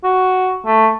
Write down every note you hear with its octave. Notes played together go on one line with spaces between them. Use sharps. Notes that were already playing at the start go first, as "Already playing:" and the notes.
F#4
A3